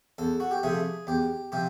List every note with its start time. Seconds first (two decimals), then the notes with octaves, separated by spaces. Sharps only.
0.18 E2 A4
0.40 F#4
0.51 G4
0.63 C3 F3 A3 G#4
1.07 E2 G4
1.52 C3 F3 G4